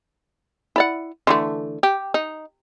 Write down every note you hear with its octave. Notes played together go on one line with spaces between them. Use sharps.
E4 D5 F#5
D3 E3 A3
G4
D#4